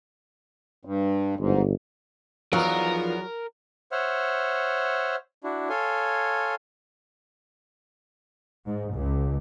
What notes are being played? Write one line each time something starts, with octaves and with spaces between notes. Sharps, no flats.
G2
G1 G#2
E2 F3 F#3 B3 D#4 F4 A#4 A#5
C5 C#5 E5 F#5 F6
D4 E4 F#4
A4 C#5 F5 G#5 C6
G#2
C#2